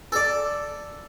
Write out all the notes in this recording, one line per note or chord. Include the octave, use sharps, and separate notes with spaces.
A4 D5